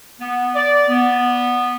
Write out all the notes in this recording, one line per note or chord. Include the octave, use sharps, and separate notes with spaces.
B3
D5
B3